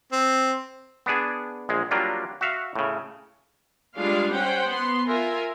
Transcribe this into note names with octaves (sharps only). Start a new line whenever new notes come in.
C4
B3 D4 G#4
A#1 G#3
F#3 G3 A#3 D4 F4
F#4 E5 F5
A2 C#3
G3 G#3 D4 F4 F5
C#4 C5 F#5 G5
B3 C6
F4 A#4 E5 G#5